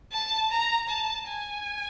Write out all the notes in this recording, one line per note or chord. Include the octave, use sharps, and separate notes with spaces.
A5
A#5
A5
G#5